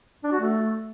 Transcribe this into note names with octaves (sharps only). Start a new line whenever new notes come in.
D4
F#4
A3